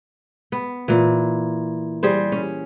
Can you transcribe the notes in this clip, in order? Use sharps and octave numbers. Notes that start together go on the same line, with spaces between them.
B3
A#2 E3
G3 G#4 C5
C#4